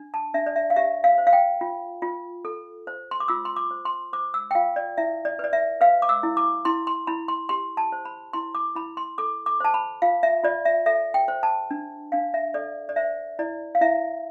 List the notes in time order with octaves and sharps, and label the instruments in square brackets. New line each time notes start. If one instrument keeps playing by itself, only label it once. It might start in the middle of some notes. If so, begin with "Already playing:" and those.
Already playing: [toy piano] D4
A5
D4 E5
D5
E5
F5
G4 E5
F5
C5
F5
G5
F4
F4
A4
C5
C6
D6
F4 E6
C6
D6
C5
C6
C5 D6
E6
G5
F4 F5
D5
E4 E5
D5
B4 D5
E5
B4 F5
D6
E6
E4
D6
E4 C6
C6
E4 B5
C6
G4 C6
A5
C5
B5
E4 C6
D6
E4 B5
C6
A4 D6
D6
C5 A5
B5
F4 F5
E5
F4 D5
E5
A4 E5
G5
C5
A5
D4
D4 F5
E5
A4 D5
D5
C5 E5
E4 D5
F5
E4 E5